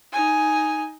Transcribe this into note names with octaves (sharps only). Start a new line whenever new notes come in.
D#4 G#5